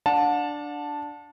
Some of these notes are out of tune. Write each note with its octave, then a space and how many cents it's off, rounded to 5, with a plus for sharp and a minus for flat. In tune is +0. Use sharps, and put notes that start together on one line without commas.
D4 +0 F#5 -40 A5 +0